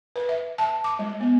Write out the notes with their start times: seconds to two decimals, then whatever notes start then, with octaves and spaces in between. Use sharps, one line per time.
0.16 B4
0.29 E5
0.58 A5
0.84 D6
0.99 G#3
1.21 B3